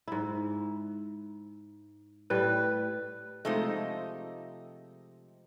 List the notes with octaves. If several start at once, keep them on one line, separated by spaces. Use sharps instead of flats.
G#2 E4
A2 G3 B4
C3 F3 G#3 A3 D#4 D#5